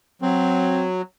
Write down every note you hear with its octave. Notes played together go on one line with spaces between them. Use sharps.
F#3 C4